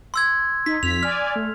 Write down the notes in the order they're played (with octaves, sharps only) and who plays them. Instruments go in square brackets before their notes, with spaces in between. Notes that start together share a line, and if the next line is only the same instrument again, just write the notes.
[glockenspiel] C6 E6 G#6
[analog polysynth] D#4 [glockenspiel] B6
[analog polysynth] F2 B6 [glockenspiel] F7
[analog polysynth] D5 G#5 [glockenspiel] F6
[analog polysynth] A3